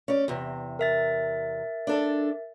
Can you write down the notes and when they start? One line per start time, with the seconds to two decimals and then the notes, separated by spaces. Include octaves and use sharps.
0.08 C#4 D5
0.28 E2 C3
0.79 A#4 E5 A6
1.87 D4 A4 D5